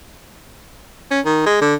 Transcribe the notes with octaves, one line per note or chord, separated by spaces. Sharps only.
C#4
D#3
G#3
D3